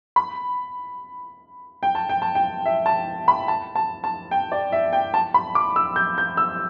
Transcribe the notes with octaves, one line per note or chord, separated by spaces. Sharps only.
B5
G5
A5
G5
A5
G5
E5
A5
B5
A5
A5
A5
G5
D5
E5
G5
A5
B5
D6
E6
G6
G6
E6